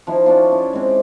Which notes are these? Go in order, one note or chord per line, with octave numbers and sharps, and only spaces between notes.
F3 D#4 E4
C#4 D4 F4
E4
G#3 C4